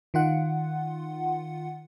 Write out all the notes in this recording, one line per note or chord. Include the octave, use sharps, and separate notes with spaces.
D#3 F4 F#5